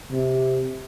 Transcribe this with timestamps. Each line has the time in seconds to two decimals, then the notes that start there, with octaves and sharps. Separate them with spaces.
0.12 C3